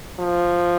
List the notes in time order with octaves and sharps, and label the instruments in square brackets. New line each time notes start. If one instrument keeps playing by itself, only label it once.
[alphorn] F3